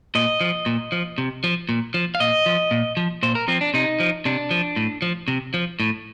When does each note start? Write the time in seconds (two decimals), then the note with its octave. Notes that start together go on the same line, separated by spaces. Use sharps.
0.15 A#2 D#5
0.41 F3
0.66 A#2
0.92 F3
1.18 C3
1.44 F3
1.69 A#2
1.94 F3
2.15 F5
2.20 A#2 D#5
2.46 F3
2.71 A#2
2.97 F3
3.23 A#2 C5
3.35 A#4
3.48 F3 C4
3.61 D4
3.74 C3 D#4
4.00 F3
4.25 C3 D4
4.51 F3
4.76 A2
5.02 F3
5.28 C3
5.54 F3
5.80 A2